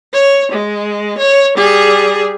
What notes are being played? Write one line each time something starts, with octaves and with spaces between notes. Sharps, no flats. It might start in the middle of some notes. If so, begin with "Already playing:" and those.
C#5
G#3
C#5
G3 G#4